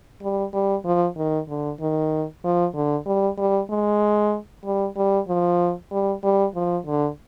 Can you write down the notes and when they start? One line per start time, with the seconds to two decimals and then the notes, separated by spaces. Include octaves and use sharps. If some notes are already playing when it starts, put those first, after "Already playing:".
0.22 G3
0.54 G3
0.85 F3
1.17 D#3
1.49 D3
1.80 D#3
2.44 F3
2.75 D3
3.06 G3
3.38 G3
3.70 G#3
4.65 G3
4.97 G3
5.28 F3
5.91 G3
6.23 G3
6.55 F3
6.86 D3